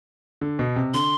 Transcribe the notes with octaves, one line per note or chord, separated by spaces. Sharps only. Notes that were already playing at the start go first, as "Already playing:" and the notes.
D3
B2
C3
D3 C6